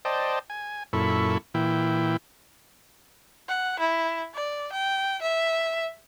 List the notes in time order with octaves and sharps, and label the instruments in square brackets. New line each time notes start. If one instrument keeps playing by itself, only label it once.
[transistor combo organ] C5 D5 D#5 G5 A5
G#5
F#2 A#2 E4 A4 B5 C#6
A#2 E3 E4 G5
[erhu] F#5
E4
D5
G5
E5